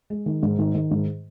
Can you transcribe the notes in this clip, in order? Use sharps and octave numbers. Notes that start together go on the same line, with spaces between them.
G#3
D#3
G#2
D#3
D#3
G#2